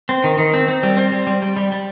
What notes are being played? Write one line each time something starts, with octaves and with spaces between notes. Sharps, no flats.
C4
D#3
D#3
C4
C4
G3
C4
G3
G3
G3
G3
G3